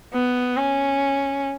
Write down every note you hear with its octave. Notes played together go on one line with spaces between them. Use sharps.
B3
C#4